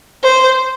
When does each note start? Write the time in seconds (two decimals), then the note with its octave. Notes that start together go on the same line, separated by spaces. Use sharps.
0.23 C5